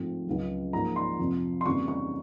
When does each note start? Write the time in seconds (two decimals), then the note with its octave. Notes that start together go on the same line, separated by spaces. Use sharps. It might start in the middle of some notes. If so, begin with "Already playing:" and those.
Already playing: G#2 F3 A3 C4
0.26 C#2 C#3 F#3
0.73 G#2 F3 A#3 A#5
0.96 C6
1.19 F2 C3 F3
1.61 C6
1.65 F2 C#3 E3 G3 A#3 C#6
1.88 C#6